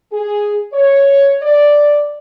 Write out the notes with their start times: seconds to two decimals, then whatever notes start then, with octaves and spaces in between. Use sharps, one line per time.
0.12 G#4
0.73 C#5
1.43 D5